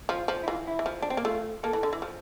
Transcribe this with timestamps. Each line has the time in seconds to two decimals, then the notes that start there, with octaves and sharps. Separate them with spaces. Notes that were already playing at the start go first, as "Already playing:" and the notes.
0.09 F3 F4
0.28 F3
0.43 E4
0.47 E3 F4
0.68 E4
0.79 E3
0.86 F3
1.02 D4
1.10 C4
1.17 A#3
1.24 A3 F4
1.63 A#3 A4
1.73 E3
1.83 D3
1.93 E3
2.02 F3